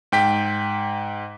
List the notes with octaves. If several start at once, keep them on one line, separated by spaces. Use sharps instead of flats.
G#2 G5 B6